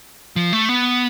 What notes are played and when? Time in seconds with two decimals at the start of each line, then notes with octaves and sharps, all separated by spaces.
0.36 F3
0.53 A3
0.69 B3